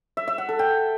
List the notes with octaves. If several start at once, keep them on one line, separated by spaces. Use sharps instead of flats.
E5
E5
F#5
A4
G5